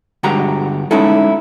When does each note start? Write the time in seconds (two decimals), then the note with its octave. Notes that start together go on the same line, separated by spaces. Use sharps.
0.23 G2 D3 G#3 F#4 G4 A#5
0.91 G#3 C#4 D#4 E4 A4